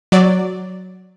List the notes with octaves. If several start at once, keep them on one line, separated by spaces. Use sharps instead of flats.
F#3 D5